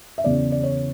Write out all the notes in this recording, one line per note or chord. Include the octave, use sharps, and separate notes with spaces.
E5
E2 C#3 E3 D5
D5
C#5